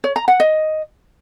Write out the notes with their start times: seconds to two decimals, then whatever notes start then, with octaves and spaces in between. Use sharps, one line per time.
0.04 C#5
0.16 A#5
0.28 F#5
0.40 D#5